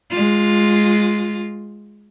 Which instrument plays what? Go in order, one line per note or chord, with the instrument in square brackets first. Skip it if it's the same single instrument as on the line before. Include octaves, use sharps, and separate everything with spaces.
[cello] G#3 F4